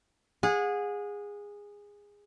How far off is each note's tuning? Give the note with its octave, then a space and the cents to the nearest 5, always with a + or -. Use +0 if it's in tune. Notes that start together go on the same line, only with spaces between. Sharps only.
G#4 -15 F#5 -35